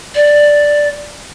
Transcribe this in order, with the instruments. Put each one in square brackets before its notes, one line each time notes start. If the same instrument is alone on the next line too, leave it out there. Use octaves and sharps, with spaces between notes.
[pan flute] D5